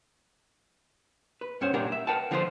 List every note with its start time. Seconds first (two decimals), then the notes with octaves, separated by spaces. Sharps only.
1.41 B4
1.61 G2 C#4 C5 F#5
1.73 C2 A#2 D4 G4 A#4 F#5
1.92 E5
2.07 A#4 B4 F#5 G5 A5
2.31 D3 F3 A3 E4 F4 C5